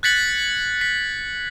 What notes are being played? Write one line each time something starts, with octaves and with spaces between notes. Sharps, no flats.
F#6 G#6 A6 B6 C#7 F#7
B6